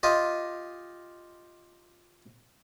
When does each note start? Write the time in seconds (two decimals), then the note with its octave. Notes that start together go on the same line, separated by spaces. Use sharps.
0.03 F4 G4 D#5